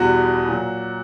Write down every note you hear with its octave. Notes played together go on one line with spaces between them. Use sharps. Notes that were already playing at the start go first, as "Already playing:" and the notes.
Already playing: E2 B2 G3 F#4
A#2 F#3